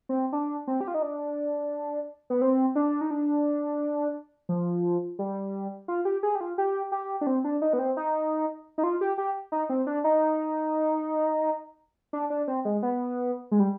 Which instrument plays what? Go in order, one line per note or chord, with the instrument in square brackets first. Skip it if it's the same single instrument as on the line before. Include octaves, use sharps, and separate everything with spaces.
[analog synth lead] C4
D4
C4
G4
F4
D#4
D4
B3
C4
D4
D#4
D4
F3
G3
F4
G4
G#4
G4
F4
G4
G4
D4
C4
D4
D#4
B3
C4
D#4
D#4
F4
G4
G4
D#4
C4
D4
D#4
D4
D4
C4
G#3
B3
G#3
G3